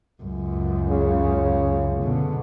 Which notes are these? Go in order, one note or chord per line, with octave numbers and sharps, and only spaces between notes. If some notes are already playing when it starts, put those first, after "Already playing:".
C#2 F#2
C#3
B2 D3